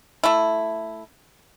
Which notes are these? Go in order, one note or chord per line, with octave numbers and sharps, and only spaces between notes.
A3 E4